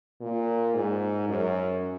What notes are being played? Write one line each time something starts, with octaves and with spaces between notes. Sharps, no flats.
A#2
G#2
F#2